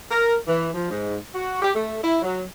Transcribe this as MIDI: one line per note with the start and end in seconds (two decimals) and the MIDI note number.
0.11 0.36 70
0.47 0.69 52
0.74 0.89 53
0.90 1.17 44
1.34 1.59 66
1.62 1.71 67
1.75 1.97 57
2.02 2.21 64
2.22 2.42 54